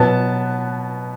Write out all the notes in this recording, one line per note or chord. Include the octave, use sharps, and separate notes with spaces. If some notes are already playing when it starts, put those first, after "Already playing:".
Already playing: B2 F#3 B3 A5